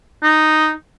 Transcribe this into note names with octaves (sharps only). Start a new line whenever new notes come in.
D#4